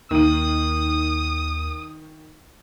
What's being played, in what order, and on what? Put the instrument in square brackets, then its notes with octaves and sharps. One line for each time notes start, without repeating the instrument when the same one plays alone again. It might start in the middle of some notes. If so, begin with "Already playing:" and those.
[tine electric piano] D#2 [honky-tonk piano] D#3 D#7 [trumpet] D#6